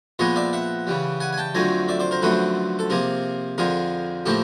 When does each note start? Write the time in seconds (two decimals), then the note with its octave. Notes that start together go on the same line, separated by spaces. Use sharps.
0.19 A#2 F3 G#3 B3 C#5 D#5
0.36 D5 E5
0.53 E5 F#5
0.87 C#3 E3 G3
1.20 F#5 G#5
1.33 G#5
1.38 G5 A5
1.55 F2 D3 F#3 A3 C4 G#5 A#5
1.88 D5 E5
2.00 C5 D5
2.11 A#4 C5
2.22 F#2 D3 F3 A3 C4 A4 B4
2.79 A4
2.90 C3 F3 A#3 G#4 A#4
3.58 F2 D3 F3 G#4 A#4
4.26 A2 F3 A#3 G4 A4